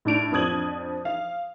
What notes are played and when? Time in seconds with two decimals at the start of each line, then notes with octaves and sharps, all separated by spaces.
0.05 A2 D4 D7 F7
0.32 F2 F3 D4 D#6 G#6 F#7
1.05 F5